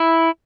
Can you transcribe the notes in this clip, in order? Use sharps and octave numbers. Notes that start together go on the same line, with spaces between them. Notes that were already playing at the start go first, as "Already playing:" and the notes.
Already playing: E4